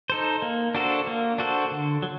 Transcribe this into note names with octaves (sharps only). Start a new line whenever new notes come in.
D#4 A4 C5
A#3
D4 F#4 A4 C5
A#3
D4 F#4 A4 C5
D3
F#3